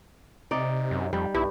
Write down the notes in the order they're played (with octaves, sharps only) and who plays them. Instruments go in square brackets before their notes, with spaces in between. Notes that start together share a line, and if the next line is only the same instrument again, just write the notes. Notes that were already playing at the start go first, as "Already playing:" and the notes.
[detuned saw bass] C3 [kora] D#4 D5
[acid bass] F#2
[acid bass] F2 [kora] G3
[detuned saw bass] B1 [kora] G2 [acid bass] E4